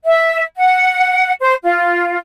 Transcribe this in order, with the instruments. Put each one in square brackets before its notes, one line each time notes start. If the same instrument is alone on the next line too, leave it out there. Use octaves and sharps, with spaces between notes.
[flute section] E5
F#5
C5
F4